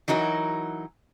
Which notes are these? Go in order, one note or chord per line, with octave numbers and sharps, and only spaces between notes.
E3 F#3 D#4 F#4 A#4